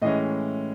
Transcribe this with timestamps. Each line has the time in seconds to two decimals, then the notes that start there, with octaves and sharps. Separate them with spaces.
0.02 A2 E3 G#3 C#4 D#5